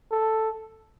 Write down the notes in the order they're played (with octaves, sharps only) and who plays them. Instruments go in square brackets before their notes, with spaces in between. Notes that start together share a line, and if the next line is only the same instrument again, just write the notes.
[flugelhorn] A4